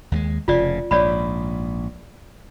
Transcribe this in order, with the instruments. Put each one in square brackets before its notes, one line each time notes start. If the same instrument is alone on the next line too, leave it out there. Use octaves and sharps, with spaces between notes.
[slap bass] D#2 G3 G#3
[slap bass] F1 C#3 [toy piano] F4 D5
[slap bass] A#1 G#2 [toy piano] C#5 D5 B5